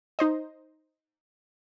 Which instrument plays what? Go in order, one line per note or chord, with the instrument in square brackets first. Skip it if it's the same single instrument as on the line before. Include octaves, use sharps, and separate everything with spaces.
[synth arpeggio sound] D#4 C5 D#5